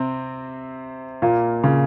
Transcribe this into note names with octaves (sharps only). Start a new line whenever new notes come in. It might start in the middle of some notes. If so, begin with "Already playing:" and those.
Already playing: C3 C4
A#2 A#3
C#3